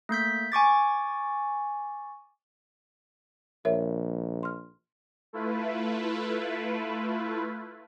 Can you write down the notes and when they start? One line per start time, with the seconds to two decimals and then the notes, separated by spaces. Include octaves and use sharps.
0.09 A3 A#3 G6 B6
0.52 G#5 C#6 D6 A6
3.65 A#1 A#4 C#5 E5
4.43 C6 F6
5.33 A3 E4 F4 B4